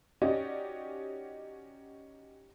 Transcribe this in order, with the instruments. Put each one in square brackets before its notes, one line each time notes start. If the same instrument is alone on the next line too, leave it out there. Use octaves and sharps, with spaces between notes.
[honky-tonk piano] C#4 D#4 F#4 G4 D5 D#5